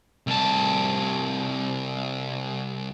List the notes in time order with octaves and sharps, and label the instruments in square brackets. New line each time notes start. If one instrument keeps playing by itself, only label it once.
[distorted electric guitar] C2 A5